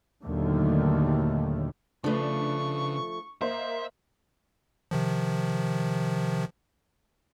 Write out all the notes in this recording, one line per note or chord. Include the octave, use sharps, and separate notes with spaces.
D#2 A#2 D3 D#3 F#3 A3
C#3 F3 A3 D4 B4 C#6
A#3 C5 D#5 E5
C3 D#3 F3